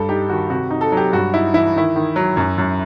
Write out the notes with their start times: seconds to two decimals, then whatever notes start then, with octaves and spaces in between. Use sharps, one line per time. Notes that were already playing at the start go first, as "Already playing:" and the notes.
Already playing: G2 A4
0.09 D#4 G4
0.29 D#3 F#4
0.50 C3 F#4
0.71 D#4
0.81 A4
0.92 F#3
0.97 G4
1.13 G2 F#4
1.34 D#4 E4
1.54 E3 E4
1.76 D#3 E4
1.96 D#3
2.16 F#3
2.37 F#2
2.58 F#2